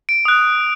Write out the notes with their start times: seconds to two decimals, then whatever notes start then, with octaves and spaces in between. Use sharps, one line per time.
0.09 D7
0.25 D#6 F#6